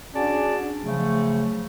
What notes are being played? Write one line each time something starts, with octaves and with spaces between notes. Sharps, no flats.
C#4 D4 F#4 G#4 D5 A5
C#3 F3 F#3 A3